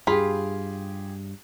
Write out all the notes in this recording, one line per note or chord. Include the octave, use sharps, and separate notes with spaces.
G2 F4 G4 G#4 B5